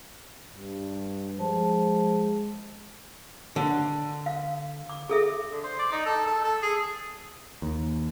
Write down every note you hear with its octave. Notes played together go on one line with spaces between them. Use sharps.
G2
F3 G#3
D3
F5
D6
G#4 A4 E5
D3
C5
D5
D#4
A4
A4
A4
G#4
D#2